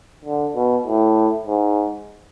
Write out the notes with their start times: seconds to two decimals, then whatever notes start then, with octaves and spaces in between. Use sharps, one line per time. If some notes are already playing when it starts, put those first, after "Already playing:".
0.25 D3
0.55 B2
0.87 A2
1.47 G#2